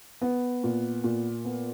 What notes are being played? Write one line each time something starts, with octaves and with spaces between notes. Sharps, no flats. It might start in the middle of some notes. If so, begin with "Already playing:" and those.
B3
A#2
A#2
B3